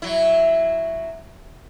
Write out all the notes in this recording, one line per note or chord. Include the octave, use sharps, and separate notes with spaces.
F#3 E4